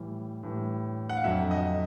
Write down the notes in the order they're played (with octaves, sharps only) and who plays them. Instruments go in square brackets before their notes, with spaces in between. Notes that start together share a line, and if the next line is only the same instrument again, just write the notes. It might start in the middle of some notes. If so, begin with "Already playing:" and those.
Already playing: [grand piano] A2 E3 G3
A2 E3 G3
F#5
F5
F2 D3 F#3 E5
D#5